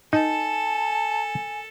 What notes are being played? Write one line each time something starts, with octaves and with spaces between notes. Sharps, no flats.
D#4 A4 G#5 A5